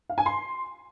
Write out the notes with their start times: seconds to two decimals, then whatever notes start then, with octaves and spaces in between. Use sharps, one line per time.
0.10 F5
0.18 G#5
0.26 C6